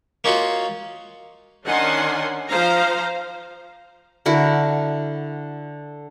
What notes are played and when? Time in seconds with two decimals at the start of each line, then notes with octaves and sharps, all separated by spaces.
0.24 A#3 C#4 D#4 F4 F#4
1.67 D#3 C#4 D4 F#5 G#5 C6
2.49 F3 C5 F5 A#5
4.26 D3 E4 F#4 A#4